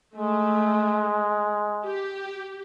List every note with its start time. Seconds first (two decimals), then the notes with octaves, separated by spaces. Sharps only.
0.16 G#3 A3
1.84 G4